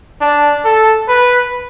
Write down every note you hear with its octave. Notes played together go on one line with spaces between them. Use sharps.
D4
A4
B4